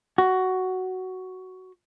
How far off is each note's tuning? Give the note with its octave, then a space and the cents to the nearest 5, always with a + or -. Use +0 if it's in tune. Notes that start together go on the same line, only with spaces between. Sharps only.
F#4 +10